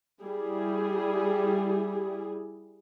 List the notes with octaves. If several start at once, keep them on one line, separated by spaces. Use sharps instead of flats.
G3 E4 G#4